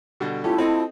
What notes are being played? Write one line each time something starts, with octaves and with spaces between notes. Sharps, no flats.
B2 D3 G3
A3 C#4 E4 F4 G4 A5
C4 A4 D#5